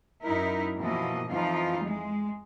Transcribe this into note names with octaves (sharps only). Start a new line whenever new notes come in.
F#2 D#4 E4 A#4
B2 E3 F3 A#3 D#5
F2 E3 F3 D#4 F4 F5
G#3